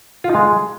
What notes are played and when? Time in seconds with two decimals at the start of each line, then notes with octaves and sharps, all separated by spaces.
0.24 F4
0.29 D#4
0.35 G#3